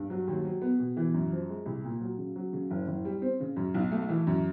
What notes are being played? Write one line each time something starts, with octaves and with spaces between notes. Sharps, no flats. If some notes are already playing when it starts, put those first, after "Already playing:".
Already playing: G2
F#3
D#2
F#3
B3
B2
E3
F#2
F3
G#3
C2
A#2
F#3
C#3
F#3
C#3
F#1
F#1
G3
C4
C#3
F#2
B1
A3
E3
F#2